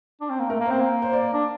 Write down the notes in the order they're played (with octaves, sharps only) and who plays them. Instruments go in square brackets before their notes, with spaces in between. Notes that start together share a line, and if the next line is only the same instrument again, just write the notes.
[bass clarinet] D4
C4
A#3
[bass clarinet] A3 [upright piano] A#4
[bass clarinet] A#3
[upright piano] C5
[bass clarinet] C4
A#3
[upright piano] C5
D5
[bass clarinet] D4